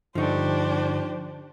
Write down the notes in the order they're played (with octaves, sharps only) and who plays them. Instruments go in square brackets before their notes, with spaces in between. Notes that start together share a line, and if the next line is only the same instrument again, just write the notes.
[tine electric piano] G2 D3 C#6 [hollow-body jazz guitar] F3 D#4 [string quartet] D4 G4 C5